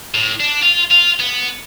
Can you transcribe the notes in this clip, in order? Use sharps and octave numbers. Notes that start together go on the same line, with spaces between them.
A2
D4
F4
F4
B3